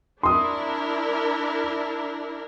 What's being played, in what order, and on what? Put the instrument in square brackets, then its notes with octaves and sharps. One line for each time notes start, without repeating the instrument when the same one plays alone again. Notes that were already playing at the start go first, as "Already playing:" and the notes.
[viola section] D4 E4 A#4 [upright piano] C6 D#6